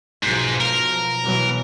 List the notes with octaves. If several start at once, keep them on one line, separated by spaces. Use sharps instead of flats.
B1 G#2 F3
A#4
B2 E3 F#3